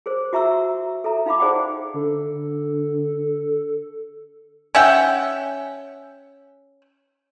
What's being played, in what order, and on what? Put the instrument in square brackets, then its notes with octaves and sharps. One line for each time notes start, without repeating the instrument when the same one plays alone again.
[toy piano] G#4 A#4 C5
F#4 E5 A#5 C#6 E6
A4 E5 A#5
D#4 F5 B5 D6
D#4 G#4 C5 D5 F#5 G5
[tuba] D3 [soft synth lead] A4
[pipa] C#4 E5 F#5 G5